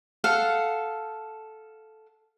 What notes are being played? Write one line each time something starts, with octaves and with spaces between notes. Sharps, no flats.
A4 F5 F#5